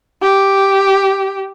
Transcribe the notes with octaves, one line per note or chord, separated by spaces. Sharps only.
G4